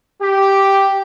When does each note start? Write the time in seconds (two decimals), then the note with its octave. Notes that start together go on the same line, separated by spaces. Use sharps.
0.21 G4